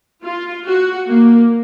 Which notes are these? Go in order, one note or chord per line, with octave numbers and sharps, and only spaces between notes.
F4
F#4
A#3